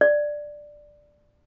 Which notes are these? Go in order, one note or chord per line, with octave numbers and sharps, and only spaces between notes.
D5